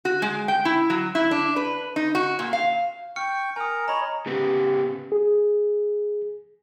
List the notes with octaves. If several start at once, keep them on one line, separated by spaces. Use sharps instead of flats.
F#4
G#3
G5
E4
F#3
E4
D4
B4
D#4
F#4
A#2
F5
G5 C#6 F6 C#7
A#4 G#5 A#5 D#6
C#5 D#5 A#5 B5
C#3 B3 G4
G#4